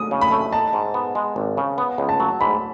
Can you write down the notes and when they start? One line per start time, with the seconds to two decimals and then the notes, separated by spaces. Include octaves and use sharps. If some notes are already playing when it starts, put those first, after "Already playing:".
Already playing: D#6
0.11 C#3
0.21 B5
0.31 A3
0.52 D#4 A5
0.73 G#2
0.94 B3
1.15 G#3
1.36 G#1
1.57 C#3
1.78 B3
1.98 C#2
2.09 A5
2.20 F#3
2.41 G#2 B5